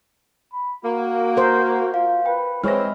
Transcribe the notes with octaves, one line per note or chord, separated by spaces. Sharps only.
B5
A#3 F#4
A#4 C5
F4 F5
B4 G5
E3 G#3 C4 E4 C#5 F6 A#6